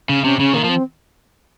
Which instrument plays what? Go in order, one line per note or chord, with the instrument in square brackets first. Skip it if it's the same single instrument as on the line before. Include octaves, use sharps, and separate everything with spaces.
[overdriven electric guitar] C#3 [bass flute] C#4
[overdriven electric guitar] C3 [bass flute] C#4
[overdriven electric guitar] C#3 [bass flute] C#4
[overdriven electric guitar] D#3 [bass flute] A#3
[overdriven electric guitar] F3
[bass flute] C4